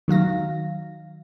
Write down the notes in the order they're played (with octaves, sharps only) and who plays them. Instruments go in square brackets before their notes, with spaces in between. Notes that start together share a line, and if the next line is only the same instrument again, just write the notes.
[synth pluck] D#3 F#3 F5 A#6